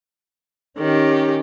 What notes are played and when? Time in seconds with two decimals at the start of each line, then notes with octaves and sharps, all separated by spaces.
0.79 D#3 C#4 G4